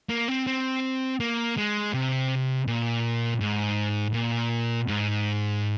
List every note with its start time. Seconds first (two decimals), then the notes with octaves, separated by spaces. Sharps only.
0.09 A#3
0.28 C4
0.47 C4
1.20 A#3
1.58 G#3
1.94 C3
2.67 A#2
3.41 G#2
4.14 A#2
4.88 G#2